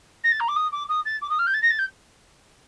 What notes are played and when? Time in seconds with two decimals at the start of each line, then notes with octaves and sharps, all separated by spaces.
0.24 A#6
0.32 A6
0.40 A#5
0.48 D6
0.56 D#6
0.72 D6
0.89 D#6
1.06 A6
1.22 D6
1.30 D#6
1.39 F6
1.47 G6
1.54 A6
1.62 A#6
1.70 A6
1.79 G6